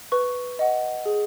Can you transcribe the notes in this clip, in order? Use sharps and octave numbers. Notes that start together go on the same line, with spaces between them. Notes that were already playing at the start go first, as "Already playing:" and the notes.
B4 C#6
D#5 F#5
G#4